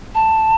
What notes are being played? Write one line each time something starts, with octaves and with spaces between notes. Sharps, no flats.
A5